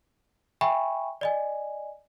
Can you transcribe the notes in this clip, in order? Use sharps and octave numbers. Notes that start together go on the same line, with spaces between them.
E5 G5 G#5 B5 C#6
D5 D#5 G#5